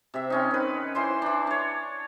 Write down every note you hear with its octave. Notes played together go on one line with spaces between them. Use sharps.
C3 E5
C4 C#4 D#4
D#3 B4
E3 C5 C6
E3 D4
D4 C#5